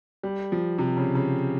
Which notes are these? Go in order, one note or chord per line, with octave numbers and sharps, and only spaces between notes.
G3
F3
C3
C#3
C#3